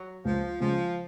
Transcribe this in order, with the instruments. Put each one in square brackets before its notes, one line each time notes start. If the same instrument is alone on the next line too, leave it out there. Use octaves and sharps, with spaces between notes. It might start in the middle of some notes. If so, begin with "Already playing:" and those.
Already playing: [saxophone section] F#3
[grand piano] C#2 [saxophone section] F3
[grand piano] C#3 G#3 [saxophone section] F3